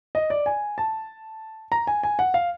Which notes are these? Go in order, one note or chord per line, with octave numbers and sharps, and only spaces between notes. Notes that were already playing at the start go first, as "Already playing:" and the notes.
D#5
D5
G#5
A5
A#5
G#5
G#5
F#5
F5